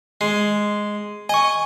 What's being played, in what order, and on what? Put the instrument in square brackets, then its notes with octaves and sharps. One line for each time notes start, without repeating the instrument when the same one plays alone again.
[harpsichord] G#3 [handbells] C7
[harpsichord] D#5 [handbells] G#5 C#6